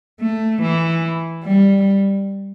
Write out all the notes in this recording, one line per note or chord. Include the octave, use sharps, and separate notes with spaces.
A3
E3
G3